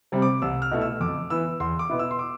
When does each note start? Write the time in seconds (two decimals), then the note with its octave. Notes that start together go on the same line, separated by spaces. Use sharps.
0.12 C3 G3 C4
0.22 D6
0.42 C2 E6
0.62 F6
0.71 B2 A3 E4
0.82 E6
1.01 F2 D6
1.30 E3 B3 E6
1.60 E2 C6
1.79 D6
1.89 B2 B3 E4
1.99 E6
2.11 C6
2.19 D6